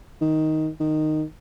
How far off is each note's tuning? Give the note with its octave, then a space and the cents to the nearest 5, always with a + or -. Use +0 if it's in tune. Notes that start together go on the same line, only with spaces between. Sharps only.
D#3 +5
D#3 -10